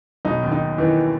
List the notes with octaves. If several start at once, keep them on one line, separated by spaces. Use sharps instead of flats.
B1 B2 D#4
D#2 D#3
D#4
D#2 D#3 E3